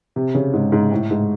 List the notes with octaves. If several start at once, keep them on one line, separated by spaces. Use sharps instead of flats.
C3
C#3
G#2
G#2
A2
G#2